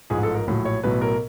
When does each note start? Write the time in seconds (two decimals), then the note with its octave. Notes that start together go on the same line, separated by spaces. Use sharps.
0.10 A1 G#2 F3 G#4
0.23 A4
0.35 A#4
0.47 A#1 A2 F#3
0.65 C#5
0.83 B1 A2 F#3 B4
1.01 A#4